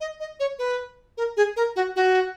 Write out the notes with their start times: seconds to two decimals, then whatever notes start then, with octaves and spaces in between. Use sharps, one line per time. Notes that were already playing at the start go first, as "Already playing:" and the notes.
0.01 D#5
0.20 D#5
0.40 C#5
0.59 B4
1.17 A#4
1.37 G#4
1.56 A#4
1.76 F#4
1.96 F#4